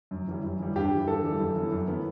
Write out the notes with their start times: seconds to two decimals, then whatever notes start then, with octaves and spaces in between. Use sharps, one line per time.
0.11 F#2
0.28 E3 G3
0.43 F#2
0.59 E3 G3
0.76 G2 G4
0.91 E3 G3
1.07 G2 A4
1.24 E3 G3
1.40 F#2
1.56 E3 B3
1.72 F#2
1.88 E3 B3